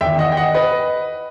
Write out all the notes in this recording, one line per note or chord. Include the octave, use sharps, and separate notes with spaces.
E2 D#3 E5 G5
D#5 F#5
G5
D#5 F#5
B4 D#5